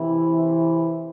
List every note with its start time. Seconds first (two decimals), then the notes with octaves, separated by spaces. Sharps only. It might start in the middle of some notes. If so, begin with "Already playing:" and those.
Already playing: C3 E3 C4 E4
0.39 E4